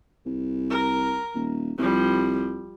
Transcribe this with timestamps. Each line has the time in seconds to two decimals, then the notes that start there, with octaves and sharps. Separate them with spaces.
0.26 C2
0.70 A#4
1.35 D#1
1.78 C2 F3 G3